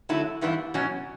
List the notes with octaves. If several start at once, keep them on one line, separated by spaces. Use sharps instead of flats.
D3 F#3 A3 E4
G2 E3 G3 B3 E4
B2 F#3 C#4